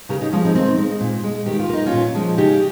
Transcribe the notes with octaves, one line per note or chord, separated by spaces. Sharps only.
C#3 G4 A#4
D#4 G4
F3 G#3 C#4 F4
C4 D#4
D#3 C4 D#4
G#3
A#2
G#3
D#3 G4
F4
A#3 D#4
C#4 F4
A#2
F3 G#3
C#3 D#4 G4